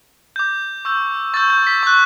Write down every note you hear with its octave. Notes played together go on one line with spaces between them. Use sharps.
D6 G6
C#6 E6 G6
C#6 E6 G6 A6
G6
B6
C#6 F#6